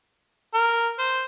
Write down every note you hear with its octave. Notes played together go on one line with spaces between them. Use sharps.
A#4
C5